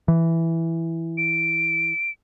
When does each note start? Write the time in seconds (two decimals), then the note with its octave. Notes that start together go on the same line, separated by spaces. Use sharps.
0.08 E3
1.18 D7